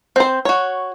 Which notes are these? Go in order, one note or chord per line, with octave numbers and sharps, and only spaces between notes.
C4 C5
F#4 C#5